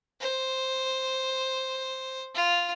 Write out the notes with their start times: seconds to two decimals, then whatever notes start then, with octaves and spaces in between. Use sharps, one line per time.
0.20 C5
2.34 F4